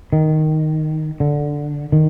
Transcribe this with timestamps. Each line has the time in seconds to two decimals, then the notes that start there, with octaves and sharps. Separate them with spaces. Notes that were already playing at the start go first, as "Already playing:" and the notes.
0.13 D#3
1.20 D3
1.92 D#3